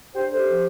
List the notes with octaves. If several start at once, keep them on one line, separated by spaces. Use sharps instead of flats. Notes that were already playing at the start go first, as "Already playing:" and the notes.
D4 G4 C5
D3 G4 C5
F3